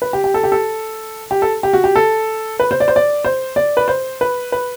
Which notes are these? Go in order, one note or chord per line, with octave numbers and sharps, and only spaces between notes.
B4
G4
G4
A4
G4
A4
G4
A4
G4
F#4
G4
A4
B4
C5
D5
C5
D5
C5
D5
B4
C5
B4
B4